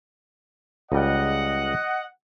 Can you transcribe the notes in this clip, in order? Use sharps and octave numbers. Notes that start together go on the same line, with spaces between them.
C#2 G3 D#5 F#5